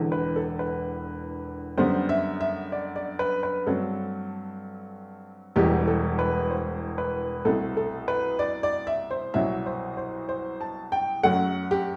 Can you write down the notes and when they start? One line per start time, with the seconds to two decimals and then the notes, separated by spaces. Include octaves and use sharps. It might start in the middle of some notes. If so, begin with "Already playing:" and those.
Already playing: E1 E2 D3
0.12 B4
0.36 A4
0.59 B4
1.78 F#2 D3 G3 B3 C5
2.09 E5
2.41 E5
2.72 D5
2.96 D5
3.19 B4
3.43 B4
3.66 G2 F#3 A3 C4 A4
5.56 E1 E2 B2 G3 G4
5.87 A4
6.19 B4
6.50 C5
6.98 B4
7.45 C2 B2 A3 C4 A4
7.77 A4
8.08 B4
8.39 D5
8.63 D5
8.87 E5
9.11 C5
9.34 C2 B2 F#3 E5
9.66 C5
9.97 C5
10.29 C5
10.61 A5
10.92 G5
11.23 F#2 F#3 A3 F#5
11.71 G4